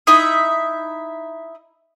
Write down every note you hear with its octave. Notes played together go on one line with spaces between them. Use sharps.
D#4 E4 E5 D#6